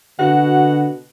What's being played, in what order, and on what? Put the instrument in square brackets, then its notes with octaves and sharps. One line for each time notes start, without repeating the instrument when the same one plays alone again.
[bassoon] B2 [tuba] D3 [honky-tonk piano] F#4 [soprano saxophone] F#5